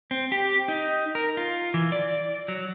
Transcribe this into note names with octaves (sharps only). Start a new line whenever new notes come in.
C4
G4
D#4
A#4
F4
E3
D5
F#3